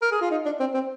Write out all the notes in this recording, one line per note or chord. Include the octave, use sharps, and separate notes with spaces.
A#4
G#4
F4
D#4
D4
C4
C4